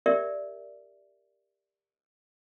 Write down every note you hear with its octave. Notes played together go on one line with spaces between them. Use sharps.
G4 A#4 D5 E5